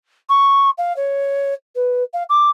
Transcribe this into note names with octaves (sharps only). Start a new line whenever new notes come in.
C#6
F5
C#5
B4
F5
D6